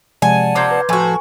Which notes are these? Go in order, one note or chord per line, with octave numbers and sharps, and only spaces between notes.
C3 F3 G#3 D5 F#5 G#5 A5
C3 F3 A#3 A#5 C6 D6 G6 G#6
B4
A2 F3 F#4 A4 G#5 C#6